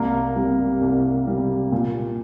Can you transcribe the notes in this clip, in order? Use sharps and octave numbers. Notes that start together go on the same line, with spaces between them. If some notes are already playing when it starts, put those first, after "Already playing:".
Already playing: C2 A#3 A#4
C3 G3
C2
C3 G3
A#2